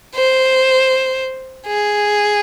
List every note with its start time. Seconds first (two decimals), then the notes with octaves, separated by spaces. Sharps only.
0.15 C5
1.67 G#4